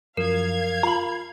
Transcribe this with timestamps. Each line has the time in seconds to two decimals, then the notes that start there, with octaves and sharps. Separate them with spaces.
0.17 F#2 F3 A#4 F5 G#6
0.83 F4 A#5 B5